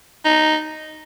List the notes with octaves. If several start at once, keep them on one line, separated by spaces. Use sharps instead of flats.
D#4